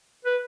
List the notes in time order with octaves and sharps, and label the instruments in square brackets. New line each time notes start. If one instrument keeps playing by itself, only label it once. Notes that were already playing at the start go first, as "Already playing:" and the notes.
[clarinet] B4